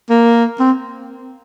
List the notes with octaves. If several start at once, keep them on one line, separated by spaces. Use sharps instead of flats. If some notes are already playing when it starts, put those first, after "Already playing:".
A#3
C4